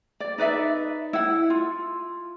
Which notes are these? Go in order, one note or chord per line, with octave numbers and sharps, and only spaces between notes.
D5
D#4 B4 D5 E5
E4 F#5
F4